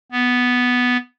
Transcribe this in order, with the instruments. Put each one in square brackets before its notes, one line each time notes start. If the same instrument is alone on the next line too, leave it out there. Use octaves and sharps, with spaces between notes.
[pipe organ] B3